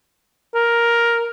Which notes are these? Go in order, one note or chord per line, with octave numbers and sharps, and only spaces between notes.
A#4